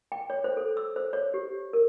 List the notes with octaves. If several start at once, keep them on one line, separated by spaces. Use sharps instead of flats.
G5
C#5
C5
A4
E6
C5
C#5
G4
A#4